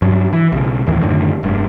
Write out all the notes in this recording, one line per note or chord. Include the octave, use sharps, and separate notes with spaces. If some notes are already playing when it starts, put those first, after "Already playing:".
G2 F#3
E3
B1 C#3
D#2 A2 D#3 E3
F#2 A2 D3 D#3
F1 G2